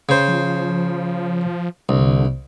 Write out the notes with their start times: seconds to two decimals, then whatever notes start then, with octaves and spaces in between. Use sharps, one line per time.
0.09 C#3 C5
0.28 F3
1.89 C2 D3